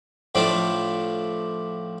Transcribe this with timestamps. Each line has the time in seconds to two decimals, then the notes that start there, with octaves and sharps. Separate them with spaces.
0.35 A2 F3 D4 D6